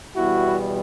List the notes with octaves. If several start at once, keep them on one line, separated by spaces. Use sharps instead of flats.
E2 B2 G3 B3 E4 F#4